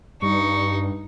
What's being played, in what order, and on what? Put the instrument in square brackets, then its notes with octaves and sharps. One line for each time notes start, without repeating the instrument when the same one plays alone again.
[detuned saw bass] G2 [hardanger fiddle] D#4 [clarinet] C#6